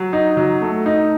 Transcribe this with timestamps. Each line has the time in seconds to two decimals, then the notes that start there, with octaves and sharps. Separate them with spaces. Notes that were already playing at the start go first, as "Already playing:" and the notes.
Already playing: F#3
0.13 D#4
0.37 F#3
0.61 A3
0.86 D#4